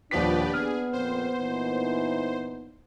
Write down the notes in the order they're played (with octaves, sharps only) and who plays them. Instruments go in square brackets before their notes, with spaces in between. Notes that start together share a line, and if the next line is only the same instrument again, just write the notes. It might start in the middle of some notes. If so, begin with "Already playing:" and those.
[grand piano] D#1 F3 B6 [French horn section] D4 [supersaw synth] G4 B4 D5
[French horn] B3 [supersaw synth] G#4 [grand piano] F6
[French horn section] F2 A#2 C4 [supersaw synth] C5
[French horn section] A#2 E3 D#4